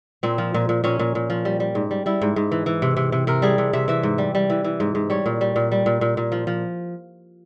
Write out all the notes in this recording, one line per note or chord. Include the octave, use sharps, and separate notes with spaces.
A#2 C4
F3
A#2
A#2
A#2 C#4
A#2
A#2
F3
G3
G3
G#2
G3
G3 E4
G#2
G#2
E3
E3
C3
C3
C3
C3 A#4
G3 G#4
C3
C3 E5
E3 E5
G#2
G3
G3
E3
E3
G#2
G#2
G3 C#5
A#2
G3
A#2
G3
A#2
A#2
A#2
F3
F3